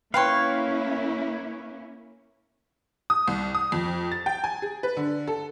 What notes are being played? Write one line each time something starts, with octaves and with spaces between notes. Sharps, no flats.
A#3 C#4 E4 B4 C#5 F5 G5 C6
D#6
C2
D#6
F2
A6
G5
G#5
G#4
B4
D3
A4